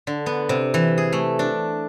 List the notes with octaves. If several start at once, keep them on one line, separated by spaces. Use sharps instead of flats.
D3
B3
C3
E3
G#4
A3
D4